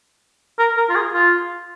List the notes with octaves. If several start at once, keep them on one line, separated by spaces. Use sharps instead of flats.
A#4
A#4
F4
G#4
F4